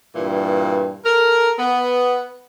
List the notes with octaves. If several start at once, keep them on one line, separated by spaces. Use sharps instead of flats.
G2 A#2 E3
A4 A#4
B3